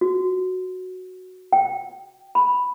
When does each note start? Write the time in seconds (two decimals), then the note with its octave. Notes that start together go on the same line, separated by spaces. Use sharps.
0.01 F#4
1.53 G5
2.35 B5